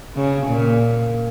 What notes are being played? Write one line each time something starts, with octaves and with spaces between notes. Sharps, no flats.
C#3
A#2